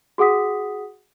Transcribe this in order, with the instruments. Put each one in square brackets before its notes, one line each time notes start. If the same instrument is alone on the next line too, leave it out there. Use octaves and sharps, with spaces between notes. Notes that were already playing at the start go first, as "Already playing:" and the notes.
[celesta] F#4 G#4 F#5 D#6 B6